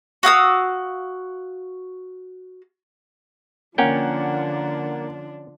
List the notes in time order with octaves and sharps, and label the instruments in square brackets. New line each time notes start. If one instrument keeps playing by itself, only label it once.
[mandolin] F#4 F5 D#6 E6
[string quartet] D3 F3 D4 [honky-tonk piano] A#3 F#5 [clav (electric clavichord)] C#4 G5